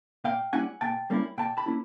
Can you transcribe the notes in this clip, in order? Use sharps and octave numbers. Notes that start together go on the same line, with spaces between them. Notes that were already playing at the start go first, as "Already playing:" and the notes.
A#2 F5 G5
G3 A#3 C#4 E4 F#5 G#5
A#2 G5 A5
G3 A#3 C#4 E4
A#2 G5 A5
A5 B5
A#3 C#4 E4